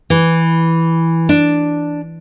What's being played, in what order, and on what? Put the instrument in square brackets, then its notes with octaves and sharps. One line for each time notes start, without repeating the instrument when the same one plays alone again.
[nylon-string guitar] E3
D4